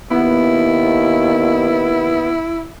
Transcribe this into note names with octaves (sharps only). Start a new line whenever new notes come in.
D#2 B3 E4